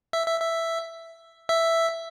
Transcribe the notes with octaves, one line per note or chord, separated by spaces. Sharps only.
E5
E5
E5
E5